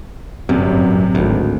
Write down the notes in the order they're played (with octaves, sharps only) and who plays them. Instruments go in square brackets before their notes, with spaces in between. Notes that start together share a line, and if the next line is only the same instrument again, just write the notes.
[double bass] G1 [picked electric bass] F#2 [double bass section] A2 F#3 [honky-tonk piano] C3
[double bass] G#1 [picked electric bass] D2